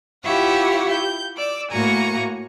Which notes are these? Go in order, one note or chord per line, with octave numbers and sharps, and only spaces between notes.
E4 F4 G4 C#5 E5 F#5
G6
D5 D6 E6
A2 A#3 F#4 G#5 A#5 C#6